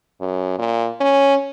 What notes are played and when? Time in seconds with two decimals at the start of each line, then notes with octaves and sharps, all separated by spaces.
0.21 F#2
0.59 A#2
1.01 C#4